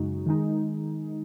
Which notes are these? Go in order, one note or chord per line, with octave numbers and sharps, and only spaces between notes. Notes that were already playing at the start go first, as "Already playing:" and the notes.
Already playing: F#2 C#3 G#3 D#4 F#4
D#3 G#3 D#4